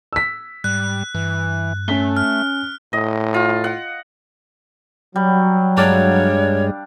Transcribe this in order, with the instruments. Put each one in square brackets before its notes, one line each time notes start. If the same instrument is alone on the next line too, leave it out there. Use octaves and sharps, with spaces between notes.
[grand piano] E6 B6
[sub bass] G#2 [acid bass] G3 [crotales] F#6
[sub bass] G2 [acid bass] E3
[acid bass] A3 [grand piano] C#4 B6 G7
[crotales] F6
[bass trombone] A2 [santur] D#5
[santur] F4
F#5
[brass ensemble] F#3 [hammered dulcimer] G3
[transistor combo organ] G2 G#3 [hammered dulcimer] D4 D5 F5 [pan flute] C#5